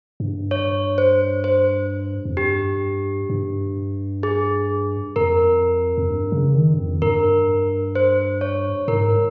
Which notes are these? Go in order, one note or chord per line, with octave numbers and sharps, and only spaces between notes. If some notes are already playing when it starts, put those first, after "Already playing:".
G2
C#5
C5
C5
F2
G2 G4
G2
G#4
F2 A#4
F2
G2
C#3
D#3
G2
F2
G2 A#4
C5
C#5
G#2 A#4